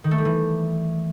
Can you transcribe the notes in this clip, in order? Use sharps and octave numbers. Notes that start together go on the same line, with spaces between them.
D#3
A3
G3
E3